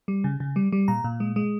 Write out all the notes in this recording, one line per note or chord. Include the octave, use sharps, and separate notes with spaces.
G3
C#3
C#3
G3
G3
A#2 A#5
A#2
G#3
G#3